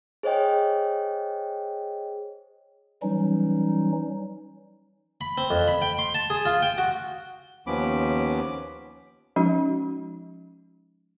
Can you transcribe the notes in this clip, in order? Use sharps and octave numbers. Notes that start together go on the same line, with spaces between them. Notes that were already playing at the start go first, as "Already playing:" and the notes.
G#4 C5 C#5 D#5 G5
E3 F#3 G3 C#4 D#4
B5
C4
F2
B5
G5
C6
A5
G#4
F4
G5
F#4
D#2 F3 B3 C#4 B5 D6
F3 G#3 C#4 D#4 F#4